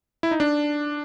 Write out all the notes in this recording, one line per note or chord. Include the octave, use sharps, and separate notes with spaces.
E4
D#4
D4